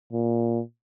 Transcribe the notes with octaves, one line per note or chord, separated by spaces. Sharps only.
A#2